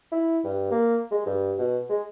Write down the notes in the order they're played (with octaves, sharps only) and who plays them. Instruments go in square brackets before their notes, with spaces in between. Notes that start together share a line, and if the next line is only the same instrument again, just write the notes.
[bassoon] E4
G2
A#3
G#3
G2
B2
G#3